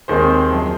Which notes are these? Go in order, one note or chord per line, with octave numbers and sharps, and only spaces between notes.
D#2 D#3 G#3 C4 G#4 C5
F#2 F3